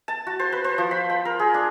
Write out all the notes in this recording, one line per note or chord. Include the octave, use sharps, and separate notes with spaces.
A5
F#4
C5
B4
C5
F3
B5
G5
A#4
G#4
D4